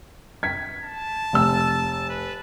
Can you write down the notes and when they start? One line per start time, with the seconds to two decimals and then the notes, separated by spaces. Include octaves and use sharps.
0.43 G#6 B6
0.83 A5
1.33 F1 E6
2.09 B4